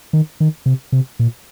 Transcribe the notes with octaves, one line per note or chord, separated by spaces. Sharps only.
D#3
D#3
C3
C3
A#2